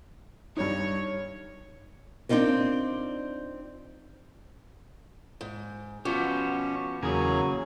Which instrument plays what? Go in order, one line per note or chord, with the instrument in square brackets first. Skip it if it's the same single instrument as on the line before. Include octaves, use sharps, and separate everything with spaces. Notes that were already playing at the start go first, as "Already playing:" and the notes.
[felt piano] G2 D#4 [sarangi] C#5
[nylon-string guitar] C4 D4 D#4 F4 A#4
[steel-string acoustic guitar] G#2
[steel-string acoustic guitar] F3 [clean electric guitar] B3 F#4 G4 [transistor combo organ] C#4
[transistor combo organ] E2 A#3 G#5 [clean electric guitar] C#3 G#4 [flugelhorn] F#3